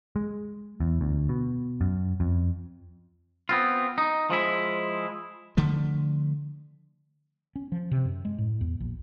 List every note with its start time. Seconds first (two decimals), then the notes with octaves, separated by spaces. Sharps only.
0.16 G#3
0.80 E2
1.01 D2
1.29 B2
1.81 F#2
2.20 F2
3.49 B3 C4 F4
3.98 D#4
4.30 F3 G#3 E4
5.57 D3 F3 A3
7.56 C#4
7.72 F3
7.91 C3
8.05 F#2
8.25 G#3
8.38 A2
8.61 E2
8.80 A#1